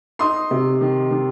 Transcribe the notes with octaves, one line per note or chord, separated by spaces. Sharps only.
D#4 C6 D#6
C3
D#3
D#3